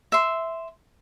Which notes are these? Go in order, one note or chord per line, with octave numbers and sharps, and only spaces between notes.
E5 C6